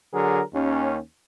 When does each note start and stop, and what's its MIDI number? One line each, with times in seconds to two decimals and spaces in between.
0.12 0.40 50
0.12 0.40 54
0.12 0.40 68
0.12 0.40 70
0.53 0.97 39
0.53 0.97 61